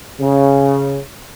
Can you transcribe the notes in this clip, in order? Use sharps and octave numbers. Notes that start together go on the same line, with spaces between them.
C#3